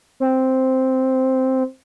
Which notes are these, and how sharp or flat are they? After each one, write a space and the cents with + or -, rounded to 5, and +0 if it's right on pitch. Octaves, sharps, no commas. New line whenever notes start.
C4 +0